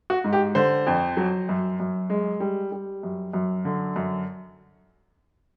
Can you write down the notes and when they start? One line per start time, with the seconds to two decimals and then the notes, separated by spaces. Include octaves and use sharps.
0.10 F#4
0.24 G#2
0.33 G4
0.55 D3 C5
0.87 F2
1.17 F#3
1.49 F#2
1.80 F#2
2.10 G#3
2.40 G3
2.72 G3
3.03 F#2
3.33 F#2
3.65 D3
3.96 F#2